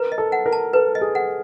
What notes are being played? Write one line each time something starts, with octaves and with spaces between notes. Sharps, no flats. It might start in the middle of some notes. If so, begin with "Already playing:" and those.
Already playing: A#4 B4
D#5
A4
F#5
A#4
A5
A4 B4
D#5
G#4
F#5